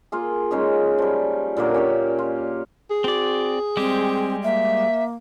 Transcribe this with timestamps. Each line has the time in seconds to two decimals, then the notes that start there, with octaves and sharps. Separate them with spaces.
0.12 A#3 F4 G#4
0.51 G#3 C#4 D#4 G#4
0.98 F3 G3
1.57 A#2 D3 F#3 A#3
1.74 C#4 G4 C#5
2.19 F4
2.91 G#4
3.04 C4 F#4 D5
3.77 G3 G#3 C4 G4
4.43 A#3 E5